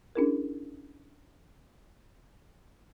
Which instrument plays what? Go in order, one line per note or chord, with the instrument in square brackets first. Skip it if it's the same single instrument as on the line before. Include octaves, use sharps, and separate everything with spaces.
[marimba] C#4 D4 E4 G#4 A#4